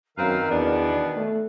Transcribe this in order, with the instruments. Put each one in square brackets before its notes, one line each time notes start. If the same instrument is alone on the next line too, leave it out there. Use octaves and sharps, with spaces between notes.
[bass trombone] F#2 [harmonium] D#3 [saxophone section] C4 B4 F5 [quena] A#5
[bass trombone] E2 [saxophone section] B2 B3 D4 [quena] D5
[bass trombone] A3